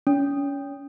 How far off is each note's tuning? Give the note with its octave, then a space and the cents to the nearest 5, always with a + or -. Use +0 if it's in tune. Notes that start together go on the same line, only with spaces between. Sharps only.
C#4 +30